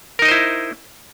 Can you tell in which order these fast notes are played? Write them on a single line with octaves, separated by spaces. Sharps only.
A#4 D#4 D#5 C5 E4